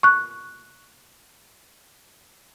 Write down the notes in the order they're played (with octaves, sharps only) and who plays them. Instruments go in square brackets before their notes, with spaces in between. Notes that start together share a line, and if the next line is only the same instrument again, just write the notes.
[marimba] C#6 F#6